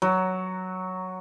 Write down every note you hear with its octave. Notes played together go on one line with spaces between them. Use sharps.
F#3